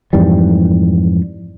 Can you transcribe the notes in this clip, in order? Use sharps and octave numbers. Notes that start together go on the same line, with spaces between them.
F2 G#2 E3 G3